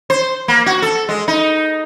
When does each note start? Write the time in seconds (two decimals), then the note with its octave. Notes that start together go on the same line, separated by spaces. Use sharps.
0.10 C5
0.48 A#3
0.66 F#4
0.82 A4
1.09 G#3
1.28 D#4